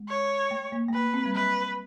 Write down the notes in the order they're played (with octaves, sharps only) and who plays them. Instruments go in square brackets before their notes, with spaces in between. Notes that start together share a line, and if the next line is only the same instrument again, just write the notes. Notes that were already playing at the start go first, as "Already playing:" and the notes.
Already playing: [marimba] G#3
[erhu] C#5
[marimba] A3
A#3
A3
[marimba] A#3 [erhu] B4
[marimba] C4
G3
[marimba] F#3 [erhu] B4